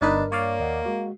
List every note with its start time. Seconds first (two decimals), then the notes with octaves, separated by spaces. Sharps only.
0.02 G1 G2 D4 D#4 A#4 B4
0.32 A#3 C#5 D5 F5
0.60 D#2 D#5 F#5
0.86 G#3 F#4